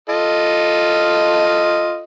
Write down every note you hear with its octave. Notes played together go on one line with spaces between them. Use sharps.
F4 A4 D#5